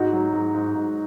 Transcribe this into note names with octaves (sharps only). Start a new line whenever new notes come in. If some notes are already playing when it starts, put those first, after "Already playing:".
Already playing: G#2 D#4 F#4
F#3
G#2
G#2
G#2